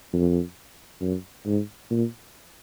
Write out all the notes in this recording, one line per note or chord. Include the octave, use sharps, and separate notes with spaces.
F2
F#2
G#2
A#2